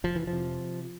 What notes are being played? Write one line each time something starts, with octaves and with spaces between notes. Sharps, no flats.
F1 F3
E3
F3
C3